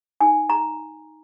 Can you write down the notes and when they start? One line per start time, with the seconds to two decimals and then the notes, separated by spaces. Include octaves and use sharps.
0.21 D#4 G#5
0.50 A#5